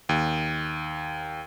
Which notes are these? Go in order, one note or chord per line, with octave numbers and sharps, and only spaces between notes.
D#2